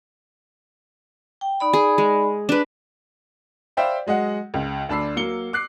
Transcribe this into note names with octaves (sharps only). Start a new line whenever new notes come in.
G5
D#4 D5 B5
G#4
G#3
D4 B4
C5 D5 E5 F5 G5 B5
F#3 G#3 D#5 F#5
C#2
D2 D4 A5 B5 E6 C7
F#3 A#3 C#7 G7
D6 F#6 C7